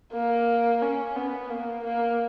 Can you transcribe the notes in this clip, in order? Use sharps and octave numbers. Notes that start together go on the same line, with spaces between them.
A#3
C#4
B3
A#3
A#3